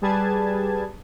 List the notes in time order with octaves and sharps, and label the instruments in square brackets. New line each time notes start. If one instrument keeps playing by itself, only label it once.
[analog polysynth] G3 G#4 B4 A5 G#6